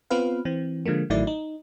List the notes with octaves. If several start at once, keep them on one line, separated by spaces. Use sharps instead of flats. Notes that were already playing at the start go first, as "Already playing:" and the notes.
B3 C4 F4 B4 F5
E3 C4
D3 F3 G#3 A#3
A1 D#3 F#3 A3 E4 D5
D#4